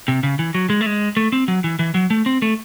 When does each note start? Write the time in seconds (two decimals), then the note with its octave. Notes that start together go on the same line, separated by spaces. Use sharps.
0.08 C3
0.23 C#3
0.39 E3
0.55 F#3
0.70 G#3
0.81 A3
0.86 G#3
1.17 A3
1.32 C4
1.48 F#3
1.64 E3
1.79 E3
1.94 F#3
2.10 A3
2.26 C4
2.42 A3